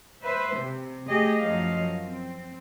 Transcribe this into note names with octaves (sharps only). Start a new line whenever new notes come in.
B4 C5 E5
C3
A3 G4 G#4 D#5
F#2 F3 F#3 D#5 F5
C4